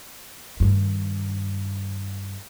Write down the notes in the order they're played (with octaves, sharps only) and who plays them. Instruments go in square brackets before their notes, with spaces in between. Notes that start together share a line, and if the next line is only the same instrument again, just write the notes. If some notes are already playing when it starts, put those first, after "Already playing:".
[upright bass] G2 D#3